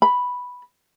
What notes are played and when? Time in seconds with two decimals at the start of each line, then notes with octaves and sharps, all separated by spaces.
0.02 B5